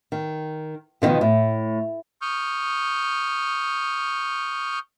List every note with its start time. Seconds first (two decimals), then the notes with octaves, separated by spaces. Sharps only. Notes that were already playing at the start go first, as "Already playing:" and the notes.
0.12 D#3
1.02 B2 D3 D#3 F3 B3
1.21 A2
2.22 C#6 D#6 F6 G6